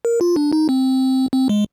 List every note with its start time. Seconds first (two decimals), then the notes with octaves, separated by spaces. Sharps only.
0.05 A#4
0.21 F4
0.36 D4
0.53 D#4
0.69 C4
1.33 C4
1.49 G#3